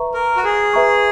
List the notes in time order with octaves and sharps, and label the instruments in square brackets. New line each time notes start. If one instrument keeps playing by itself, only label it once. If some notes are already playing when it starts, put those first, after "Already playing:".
Already playing: [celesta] B4 E5 A#5 C#6
[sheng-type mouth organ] A#4
F#4
G#4
[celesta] B4 E5 A#5 C#6